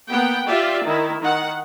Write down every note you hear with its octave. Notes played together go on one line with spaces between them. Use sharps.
A#3 B3 F#5 G5
F4 G4 D5 E5
D#3 E4
D#3 F#5